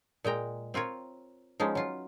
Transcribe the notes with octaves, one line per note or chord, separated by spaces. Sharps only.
A#2 G#3 G5 A#5
C4 F4 A#4 C#5
F3 G#3 B3 C#4 D#4
F#3 F4